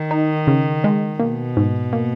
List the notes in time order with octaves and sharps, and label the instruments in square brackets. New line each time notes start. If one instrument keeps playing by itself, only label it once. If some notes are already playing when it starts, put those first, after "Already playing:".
Already playing: [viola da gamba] D#3
[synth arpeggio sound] D#4
C#3
G#3
[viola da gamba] B2 [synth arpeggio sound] A#3
[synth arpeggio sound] G#2
A#3